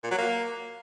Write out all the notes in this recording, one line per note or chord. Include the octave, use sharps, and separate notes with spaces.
A#2
F#3
A#3